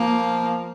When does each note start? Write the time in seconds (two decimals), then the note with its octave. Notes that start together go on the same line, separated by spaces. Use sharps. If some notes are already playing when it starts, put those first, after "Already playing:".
Already playing: F3 A#3